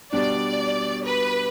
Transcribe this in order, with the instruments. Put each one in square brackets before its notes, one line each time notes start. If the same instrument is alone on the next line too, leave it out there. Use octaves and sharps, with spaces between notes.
[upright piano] B2 G3 D4 [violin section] D5
[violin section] B4